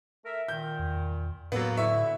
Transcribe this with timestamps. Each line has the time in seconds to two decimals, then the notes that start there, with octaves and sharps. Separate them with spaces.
0.24 A3 A#4 E5
0.48 A#2 D#3 G6
0.79 E2
1.52 A2 F#3 A#3 B3 A4
1.77 D3 E4 E5 C#6